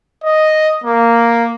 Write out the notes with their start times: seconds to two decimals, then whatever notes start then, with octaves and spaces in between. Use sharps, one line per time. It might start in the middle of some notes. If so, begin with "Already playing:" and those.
0.24 D#5
0.84 A#3